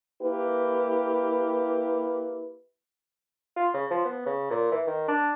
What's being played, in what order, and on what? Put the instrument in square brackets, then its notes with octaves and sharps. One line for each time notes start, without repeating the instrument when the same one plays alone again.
[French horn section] A#3 E4 G4 B4
[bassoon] F4
C#3
F3
B3
C#3
A#2
E3
D#3
D4